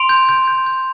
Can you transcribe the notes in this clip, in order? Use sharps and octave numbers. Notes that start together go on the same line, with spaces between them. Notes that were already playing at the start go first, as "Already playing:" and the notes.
Already playing: C6 D7 F7
G6
G6
G6
G6